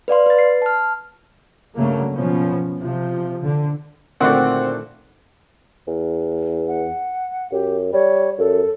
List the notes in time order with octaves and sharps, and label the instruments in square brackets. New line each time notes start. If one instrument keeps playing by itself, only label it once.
[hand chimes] B4 D5 F5 C6
B4 A6
C7
A5 F6
[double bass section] G2 C#3 F#3 A3 A#3
B2 F3 B3 C#4
C3 F3
D3
[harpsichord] A#2 F#4 D5 [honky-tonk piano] D3 D#3 A3 [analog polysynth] C4 [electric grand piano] F#5
[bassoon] E2
[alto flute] F#5
[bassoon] F#2 [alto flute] G4
[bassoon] G3 [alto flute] C#5
[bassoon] F#2 [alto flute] A4